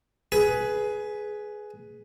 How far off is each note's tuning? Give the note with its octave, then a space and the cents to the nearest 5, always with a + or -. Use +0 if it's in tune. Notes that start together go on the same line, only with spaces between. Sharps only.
G#4 +15 B4 +0